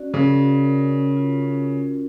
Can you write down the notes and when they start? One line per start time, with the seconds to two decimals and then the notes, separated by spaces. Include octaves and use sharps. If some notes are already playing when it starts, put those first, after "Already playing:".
Already playing: C#4 F#4 D5
0.14 C#3 A#4
0.40 F#4
0.66 A#4
0.91 C#4
1.17 F4
1.42 C#4
1.67 C#4